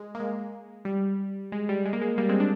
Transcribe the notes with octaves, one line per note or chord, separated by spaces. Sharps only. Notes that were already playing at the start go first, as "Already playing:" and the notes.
Already playing: G#3
A#3
G#3
G3
G#3
G3
G#3
A#3
G#3
G3 A#3
G#3 C4
D4